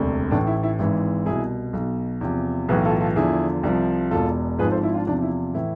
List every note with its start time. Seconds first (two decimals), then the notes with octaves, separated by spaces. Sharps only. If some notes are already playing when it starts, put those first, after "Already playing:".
Already playing: E1 D2 C3
0.31 A1 A2 E3 D4
0.47 E4
0.63 E4
0.79 G#1 G#2 E3 E4
1.26 C2 B2 E4 G#4
1.73 B1 B2
2.21 E2 C3 F3
2.69 B1 A2 E3 G#4 B4
2.85 F4 A4
3.00 F4 A4
3.16 E2 D3 F3 E4 G#4
3.63 C2 C3 F3
4.11 E1 E2 B2 F4 A4
4.59 G#1 G#2 F3 G#4 B4
4.71 A4 C5
4.83 E4
4.94 D4 F4
5.07 E2 C3 F3 D4
5.23 E4
5.54 A2 E3 E4